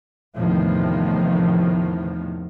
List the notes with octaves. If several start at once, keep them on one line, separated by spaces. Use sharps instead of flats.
E2 A2 C3 D#3 F3